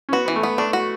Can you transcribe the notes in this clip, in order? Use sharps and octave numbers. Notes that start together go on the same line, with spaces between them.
C#4
B3 F#4
E3 B3
A3
B3
A3 D4
F#4